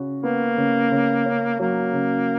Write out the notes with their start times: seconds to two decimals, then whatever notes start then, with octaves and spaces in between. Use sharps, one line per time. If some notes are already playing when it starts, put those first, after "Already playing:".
Already playing: C#3 F#4
0.23 A#3 B3
0.57 C#3
0.91 C#3
1.26 C#4
1.59 F#3 A#3
1.94 C#3